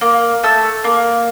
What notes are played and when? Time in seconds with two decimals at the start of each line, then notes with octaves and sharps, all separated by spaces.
0.01 A#3
0.43 A3 A5 E6
0.84 A#3